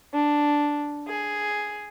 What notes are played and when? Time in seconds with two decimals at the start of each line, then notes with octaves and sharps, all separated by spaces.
0.13 D4
1.08 G#4